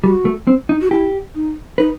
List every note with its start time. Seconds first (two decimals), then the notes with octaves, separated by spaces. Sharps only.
0.04 G3 F#4
0.25 A3
0.47 C4
0.69 D#4
0.81 F#4
0.91 E4 G4
1.35 D#4
1.78 D#4 B4